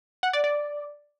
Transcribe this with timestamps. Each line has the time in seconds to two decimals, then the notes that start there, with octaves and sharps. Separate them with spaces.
0.23 F#5
0.33 D5
0.44 D5